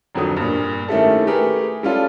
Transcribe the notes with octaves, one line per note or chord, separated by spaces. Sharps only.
G#1 F2 D3 F#3 D#6
G2 A#2
D#3 A3 C#4 E4 G4 A4
A3 G4 G#4 A#4 B4
G3 C#4 F4 A4